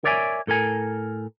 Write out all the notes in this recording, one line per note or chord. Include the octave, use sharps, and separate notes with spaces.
A#4 C#5 D5 E5 F#5 G#5
A2 A4 A#4 G#5